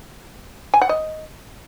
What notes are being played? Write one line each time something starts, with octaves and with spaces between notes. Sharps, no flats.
G#5
F#5
D#5